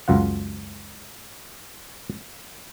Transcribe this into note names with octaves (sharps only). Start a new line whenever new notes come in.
C#2 F#2 F4 F#5